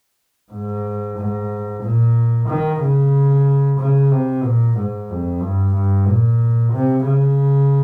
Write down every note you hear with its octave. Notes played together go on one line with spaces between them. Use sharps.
G#2
G#2
A#2
D#3
C#3
C#3
C3
A#2
G#2
F2
G2
G2
A#2
C3
C#3